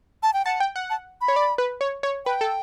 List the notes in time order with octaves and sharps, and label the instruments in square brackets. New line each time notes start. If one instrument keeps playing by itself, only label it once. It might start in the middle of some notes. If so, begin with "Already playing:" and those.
[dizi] A5
G5
[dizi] F#5 [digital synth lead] A5
[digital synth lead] G5
F#5
[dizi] A5
B5
[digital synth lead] C#5
D5
B4
C#5
C#5
[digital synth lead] B4 [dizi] G5
[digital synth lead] A4